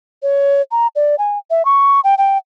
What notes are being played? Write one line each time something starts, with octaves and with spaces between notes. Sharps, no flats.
C#5
A#5
D5
G#5
E5
C#6
G5
G5